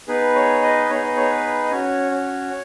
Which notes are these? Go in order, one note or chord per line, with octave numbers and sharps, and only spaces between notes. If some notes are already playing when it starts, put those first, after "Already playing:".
B3 D#4 G#4 B4
C#5
B4 D#5
B3 D#4 G#4 C#5
D#5
C#5
B4
D#5
C#4 F#4 C#5
C#5